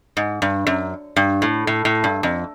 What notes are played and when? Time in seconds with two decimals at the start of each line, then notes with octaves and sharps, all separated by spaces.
0.17 G#2
0.42 G2
0.67 F#2
1.16 G2
1.42 A2
1.67 A2
1.85 A2
2.04 G2
2.23 F2